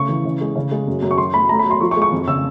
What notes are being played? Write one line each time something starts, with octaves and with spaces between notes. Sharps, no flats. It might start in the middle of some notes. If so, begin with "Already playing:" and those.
Already playing: C#3 A3 C#6
E3
C#3
G#3
C#3
G#3
F#2
F#2
C#6
F#3 C6
A3 B5
A3 A#5
B5
F#3
C6
F3 C#6
C#6
G#3
C#6
F2
C#3 E6